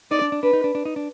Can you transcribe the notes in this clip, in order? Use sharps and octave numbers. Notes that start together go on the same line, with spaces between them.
D#4 D5
D4
D4
D4 B4
D#4
D4
D4
D#4
D4